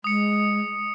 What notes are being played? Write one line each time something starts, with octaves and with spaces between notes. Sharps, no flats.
G#3 D#6 C#7